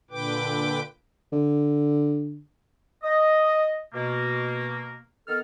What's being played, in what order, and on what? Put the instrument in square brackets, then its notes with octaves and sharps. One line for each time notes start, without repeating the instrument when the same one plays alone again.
[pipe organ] A#2 D3 B4 G5 D6
[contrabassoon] D3
[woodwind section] D#5
B2 A#3
D#3 B3 A4 F6